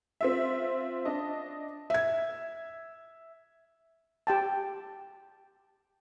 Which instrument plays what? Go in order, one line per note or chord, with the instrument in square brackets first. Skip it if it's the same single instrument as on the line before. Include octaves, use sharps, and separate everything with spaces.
[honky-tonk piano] C4 F4 E5
D4 D#5 A5
[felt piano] E5 G#6
[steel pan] G4 G5 A5